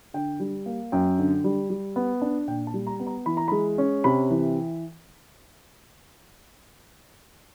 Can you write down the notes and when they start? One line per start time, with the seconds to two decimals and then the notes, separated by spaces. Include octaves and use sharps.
0.14 D3 G5
0.40 G3
0.66 A#3
0.92 F#2 G5
1.18 D3
1.44 G3
1.70 G3
1.96 B3
2.22 D4
2.48 A#2 G5
2.67 A5
2.74 G3
2.87 A#5
3.00 B3
3.07 A#5
3.26 E3 B5
3.37 A#5
3.48 G#3 B5
3.78 C#4
4.04 C3 B5
4.30 E3